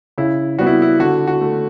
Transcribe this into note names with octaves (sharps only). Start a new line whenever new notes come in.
C#3 E4
G3 B3 F#4
E4
E4
D3 F#4
F#4
A3